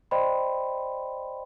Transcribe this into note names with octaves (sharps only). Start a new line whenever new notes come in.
C5 D5 D#5 G5 B5 C6